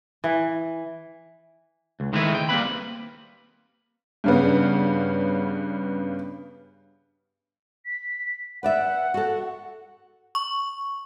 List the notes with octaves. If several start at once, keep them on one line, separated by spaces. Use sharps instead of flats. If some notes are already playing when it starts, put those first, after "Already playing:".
E3
C#2
D#3 G#3 A3 C4 E4 B4
G5
G3 A#3 C4 E4 B4 B5
G2 C#3 B3
B6
B4 D5 E5 F#5
F#4 A4
C#6